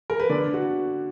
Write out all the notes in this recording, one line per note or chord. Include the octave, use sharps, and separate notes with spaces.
A#4
B4
D3 D5
F#4